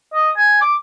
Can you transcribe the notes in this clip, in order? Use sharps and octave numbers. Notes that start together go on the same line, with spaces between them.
D#5
G#5
D6